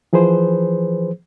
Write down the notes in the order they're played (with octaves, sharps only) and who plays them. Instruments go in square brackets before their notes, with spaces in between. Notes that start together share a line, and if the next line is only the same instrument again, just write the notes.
[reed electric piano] E3 F3 G#4 B4 C5